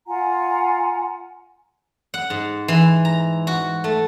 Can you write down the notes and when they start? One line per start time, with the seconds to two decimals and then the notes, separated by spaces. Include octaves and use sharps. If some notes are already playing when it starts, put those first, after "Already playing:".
0.06 F4 F#5 G#5 A#5
2.14 F#5
2.30 G#2
2.68 E3
3.05 A#5
3.47 F#4
3.84 A3